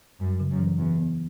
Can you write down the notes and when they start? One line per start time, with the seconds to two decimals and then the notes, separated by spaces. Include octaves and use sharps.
0.20 F#2 G3
0.40 C#3
0.50 F#2
0.59 E3
0.79 E2 E3
0.98 B3